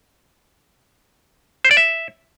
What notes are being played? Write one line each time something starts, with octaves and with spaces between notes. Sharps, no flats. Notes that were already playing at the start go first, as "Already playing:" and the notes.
C5
D5
E5